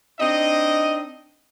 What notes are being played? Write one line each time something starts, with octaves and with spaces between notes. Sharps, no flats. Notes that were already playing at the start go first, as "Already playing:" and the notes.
C4 D4 D#4 D#5